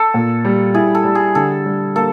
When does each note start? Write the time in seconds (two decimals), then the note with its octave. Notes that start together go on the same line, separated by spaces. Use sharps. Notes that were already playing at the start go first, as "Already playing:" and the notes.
Already playing: A4
0.14 A#2
0.45 G3
0.75 E4 G#4
0.95 A4
1.05 G3
1.15 G#4
1.35 D3 A4
1.66 G3
1.96 A#3 A4